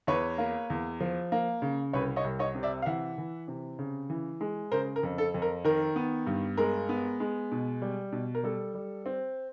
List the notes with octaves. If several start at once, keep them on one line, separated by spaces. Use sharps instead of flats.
E2 B4 C#5
A#3
E2
F3
A#3
C#3
C2 B4 C#5
C#5 D#5
C2
C#5 D#5
C3
D5 E5
F5
E3 E5 F#5
E3
C3
C#3
E3
G#3
C#3 A#4 C5
A#4
F2
A4
F2
A#4
D#3 A#4
B3
G2
G#3 A#4
B3
G#3
B2
G3
B2
A#4
G3 A4
G3
C4